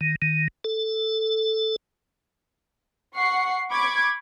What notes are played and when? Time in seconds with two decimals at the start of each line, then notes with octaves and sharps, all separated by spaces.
0.01 D#3
0.22 D#3
0.64 A4
3.15 F#5 C#6 C7
3.71 B5 C#6 D6 G#6